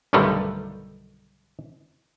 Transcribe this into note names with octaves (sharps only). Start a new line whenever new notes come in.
B1 G2 D3 D#3 G3 A3